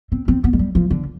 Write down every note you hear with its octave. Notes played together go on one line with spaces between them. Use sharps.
C4
C4
B3
G#3
G3
F3
D3